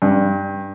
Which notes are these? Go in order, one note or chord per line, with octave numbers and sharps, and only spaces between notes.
G2